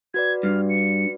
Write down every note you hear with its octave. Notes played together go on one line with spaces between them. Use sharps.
F#4 B4 D5 G#6
G2 F6
C#7